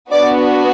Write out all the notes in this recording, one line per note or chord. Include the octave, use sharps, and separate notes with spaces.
B3 D4 F#4 D5